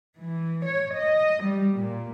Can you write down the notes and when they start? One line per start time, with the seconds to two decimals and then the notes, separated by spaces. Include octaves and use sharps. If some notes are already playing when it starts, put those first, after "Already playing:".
0.20 E3
0.65 C#5
0.96 D#5
1.43 G3
1.76 A#2